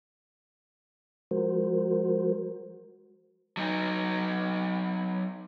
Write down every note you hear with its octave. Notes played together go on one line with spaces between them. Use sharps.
F3 G#3 F#4 A#4 C5
F#3 D#4